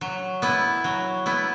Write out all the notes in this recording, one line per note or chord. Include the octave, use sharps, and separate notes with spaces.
F#3
B3 E4
F#3
B3 E4